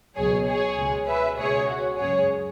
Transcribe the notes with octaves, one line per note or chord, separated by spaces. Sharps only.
C#2 B2 F#3 G#4 C#5
G#4 C#5
C#2 B2 G#3
B4 E5
C#2 B2 G#3 G#4 C#5
F#4
F#2 C#3 G#3 G#4 C#5